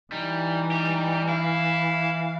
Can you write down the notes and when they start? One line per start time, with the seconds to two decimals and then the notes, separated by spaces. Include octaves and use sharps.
0.12 E3 G3 D#4
0.72 G3 G4
1.29 E4 F5